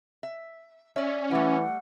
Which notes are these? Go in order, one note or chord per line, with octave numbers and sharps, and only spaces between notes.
E5
C#4 D5 E5
E3 G3 A3 F#5